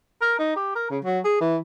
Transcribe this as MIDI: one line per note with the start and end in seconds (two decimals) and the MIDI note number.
0.22 0.36 70
0.39 0.56 63
0.56 0.71 67
0.75 0.85 70
0.91 0.99 49
1.04 1.19 54
1.25 1.39 68
1.41 1.57 52